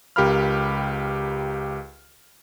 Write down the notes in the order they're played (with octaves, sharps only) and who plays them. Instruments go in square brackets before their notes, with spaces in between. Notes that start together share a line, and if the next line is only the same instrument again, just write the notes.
[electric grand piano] C#2 G4 A#4 F5 B5 F6